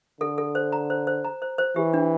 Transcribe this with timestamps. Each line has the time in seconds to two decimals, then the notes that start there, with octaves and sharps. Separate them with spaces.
0.21 D3 A4
0.38 A4
0.55 C5
0.72 A#5
0.90 C5
1.07 C5
1.24 A#5
1.42 C5
1.58 C5
1.76 E3 G4
1.94 D4